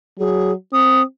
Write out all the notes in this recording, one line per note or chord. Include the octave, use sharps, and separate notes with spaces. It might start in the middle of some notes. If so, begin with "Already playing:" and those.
F#3 G#4
C4 D#6